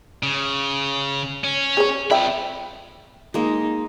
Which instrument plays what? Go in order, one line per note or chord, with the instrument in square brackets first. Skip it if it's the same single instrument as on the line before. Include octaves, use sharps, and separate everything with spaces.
[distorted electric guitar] C#3
C#4
[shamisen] G#4 C#5
[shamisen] F3 E5 G5 [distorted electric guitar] C4 B5
[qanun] G#3 A#3 [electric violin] D#4